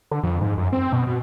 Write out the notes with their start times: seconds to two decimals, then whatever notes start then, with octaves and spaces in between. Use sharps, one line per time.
0.11 D3
0.23 F2
0.41 G#2
0.57 F#2
0.72 C4
0.92 B2
1.07 B2